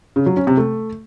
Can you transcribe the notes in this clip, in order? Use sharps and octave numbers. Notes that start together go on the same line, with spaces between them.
C#3
F#3
C#4
C3
A3